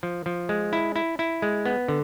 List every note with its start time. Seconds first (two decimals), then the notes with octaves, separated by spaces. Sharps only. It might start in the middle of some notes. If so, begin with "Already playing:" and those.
0.03 F3
0.26 F3
0.49 G#3
0.73 E4
0.96 E4
1.19 E4
1.42 G#3
1.65 B3
1.88 D3